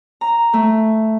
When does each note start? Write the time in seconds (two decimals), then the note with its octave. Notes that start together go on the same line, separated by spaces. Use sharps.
0.21 A#5
0.53 A3